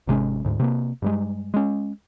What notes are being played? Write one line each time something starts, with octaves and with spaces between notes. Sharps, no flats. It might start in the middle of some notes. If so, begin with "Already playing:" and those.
G#1 C3 G#3 C#4
D2 G#2
C3 A#3
G2 G3 G#3
G#3 C#4